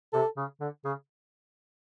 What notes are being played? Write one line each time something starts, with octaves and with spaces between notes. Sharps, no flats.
C3 A4
C#3
D3
C#3 G#4